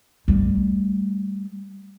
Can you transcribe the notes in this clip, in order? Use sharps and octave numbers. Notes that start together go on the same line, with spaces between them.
G3 A3